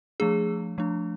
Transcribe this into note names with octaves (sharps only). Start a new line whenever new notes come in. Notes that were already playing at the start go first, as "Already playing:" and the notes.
F3 A3 D4 G#4
F3 A3 D4